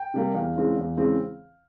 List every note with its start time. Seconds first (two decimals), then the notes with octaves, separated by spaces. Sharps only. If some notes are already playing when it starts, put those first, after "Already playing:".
Already playing: G5
0.14 C3 G3 A#3
0.34 E2 F5
0.56 C#3 E3 G#3 C4
0.77 E2
0.97 C#3 E3 G#3 C4